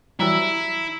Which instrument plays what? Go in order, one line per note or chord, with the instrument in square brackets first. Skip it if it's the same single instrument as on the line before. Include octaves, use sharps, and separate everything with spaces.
[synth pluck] E3 F#3 G3 [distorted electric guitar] E4 [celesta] A#5 E6